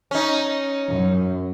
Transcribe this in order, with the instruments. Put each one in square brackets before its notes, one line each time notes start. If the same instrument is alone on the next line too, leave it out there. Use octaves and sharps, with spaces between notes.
[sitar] C#4 D#4
[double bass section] F#2